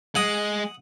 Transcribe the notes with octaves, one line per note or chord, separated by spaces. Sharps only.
G#3 F#5 D#6